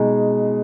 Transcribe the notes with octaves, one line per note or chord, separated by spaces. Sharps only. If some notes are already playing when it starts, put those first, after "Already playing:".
Already playing: B2 G#3 D#4 G#4